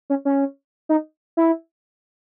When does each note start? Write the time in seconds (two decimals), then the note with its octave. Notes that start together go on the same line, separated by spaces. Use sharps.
0.10 C#4
0.25 C#4
0.89 D#4
1.37 E4